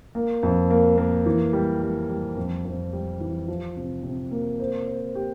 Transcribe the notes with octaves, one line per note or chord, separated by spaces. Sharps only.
A#3
F2
A#3
A#3
E3
G3
G3
G3
F2
F2
G3
E3
F3
C3
C3
A#3
C5
C5
G4